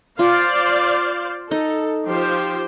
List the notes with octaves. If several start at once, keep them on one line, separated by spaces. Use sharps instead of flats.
F4 C5 D5 F5
D#4 A4
F3 G4 C5